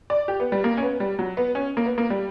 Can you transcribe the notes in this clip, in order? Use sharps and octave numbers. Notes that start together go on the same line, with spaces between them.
D5
G4
B3
G3
A#3
C#4
B3
G3
F#3
B3
C#4
A#3
B3
A#3
G3